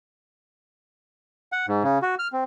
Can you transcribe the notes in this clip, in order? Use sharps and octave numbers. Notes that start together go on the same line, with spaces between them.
F#5
G#2
C#3
F#4
F6
C4